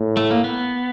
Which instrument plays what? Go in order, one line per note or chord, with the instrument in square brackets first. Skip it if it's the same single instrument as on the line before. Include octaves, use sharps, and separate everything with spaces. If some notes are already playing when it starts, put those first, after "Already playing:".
Already playing: [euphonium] A2
[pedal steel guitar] A3
A#3
B3